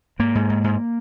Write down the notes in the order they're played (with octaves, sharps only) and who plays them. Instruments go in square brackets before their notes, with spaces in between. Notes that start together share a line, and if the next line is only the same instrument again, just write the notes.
[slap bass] G#2 A#3
G#2
G#2
G#2